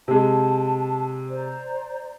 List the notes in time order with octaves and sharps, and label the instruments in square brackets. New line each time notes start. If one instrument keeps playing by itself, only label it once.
[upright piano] C3 G#3 [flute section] A5
[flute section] C5 D5 A#5